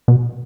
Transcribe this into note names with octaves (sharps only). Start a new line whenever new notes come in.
B2